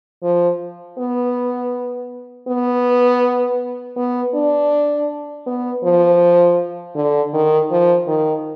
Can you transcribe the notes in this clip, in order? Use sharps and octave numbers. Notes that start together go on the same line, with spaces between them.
F3
B3
B3
B3
D4
B3
F3
D3
D#3
F3
D#3